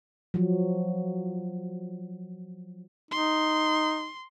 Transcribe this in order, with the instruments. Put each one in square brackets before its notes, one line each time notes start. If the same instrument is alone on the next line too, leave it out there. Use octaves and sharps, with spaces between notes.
[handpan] F3 F#3
[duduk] D#4 [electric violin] C6